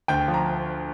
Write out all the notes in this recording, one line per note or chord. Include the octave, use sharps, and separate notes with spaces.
D2 G5
F3
A#5